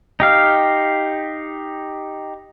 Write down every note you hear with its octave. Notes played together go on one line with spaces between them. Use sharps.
D#4 G4 F5